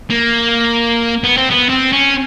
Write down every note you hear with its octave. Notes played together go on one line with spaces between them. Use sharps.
A#3
B3
C4
B3
C4
C#4